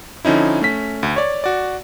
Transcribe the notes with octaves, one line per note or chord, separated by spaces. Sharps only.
D3 F3 C#4 D#4 E4
A3 C#4 B6
D2
C#5 D5
F#4 D5